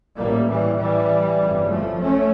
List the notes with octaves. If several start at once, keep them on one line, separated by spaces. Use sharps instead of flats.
A1 A2 G3 A#3
E3 G3
E3 G3
G1 F2 C#3
F3 A3
A3 C#4